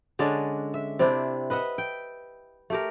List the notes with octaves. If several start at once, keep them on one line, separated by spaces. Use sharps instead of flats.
D3 G#3 C#4 D4
E5
C3 C4 D4 E4
B4 D#5 E5 F#5
G5
A3 G4 A#4